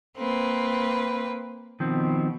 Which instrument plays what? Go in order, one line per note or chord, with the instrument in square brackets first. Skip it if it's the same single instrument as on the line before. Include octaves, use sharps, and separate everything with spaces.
[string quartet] A#3 C4 B4
[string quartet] B2 [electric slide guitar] D#3 F3 C4